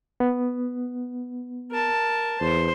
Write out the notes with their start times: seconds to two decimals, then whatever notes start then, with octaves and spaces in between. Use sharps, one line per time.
0.20 B3
1.71 A#4 A5
2.41 E2 C5